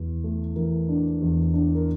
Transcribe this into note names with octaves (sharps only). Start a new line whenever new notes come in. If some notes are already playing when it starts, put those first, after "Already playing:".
Already playing: E2 E3
A3
E3 A#4
D4
E2
D4
A#4